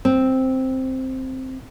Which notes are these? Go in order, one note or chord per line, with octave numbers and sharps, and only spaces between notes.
C4